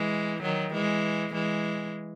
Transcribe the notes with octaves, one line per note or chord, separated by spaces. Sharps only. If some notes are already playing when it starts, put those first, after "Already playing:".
Already playing: E3 G#3
D#3 F#3
E3 G#3
E3 G#3